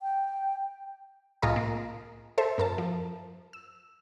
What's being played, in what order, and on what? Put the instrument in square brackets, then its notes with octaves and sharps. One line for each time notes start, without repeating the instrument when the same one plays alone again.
[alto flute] G5
[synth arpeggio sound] C2 A2 F4 G#4 D#5 A#5
A#3
A4 C5 E5
F#2 A#4 A5
F3
E6